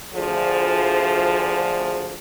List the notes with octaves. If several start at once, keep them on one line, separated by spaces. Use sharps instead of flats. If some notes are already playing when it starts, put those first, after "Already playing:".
D2 F3 G#4